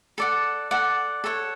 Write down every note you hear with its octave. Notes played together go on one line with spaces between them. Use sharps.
A4 D5 F#5
A4 D5 F#5
A4 C#5 F#5